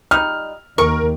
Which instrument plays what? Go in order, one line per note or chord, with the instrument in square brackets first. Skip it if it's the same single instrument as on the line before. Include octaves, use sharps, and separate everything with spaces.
[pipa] G3 D#4 F4 [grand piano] F6
[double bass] D#2 [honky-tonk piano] A#4 [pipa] C#6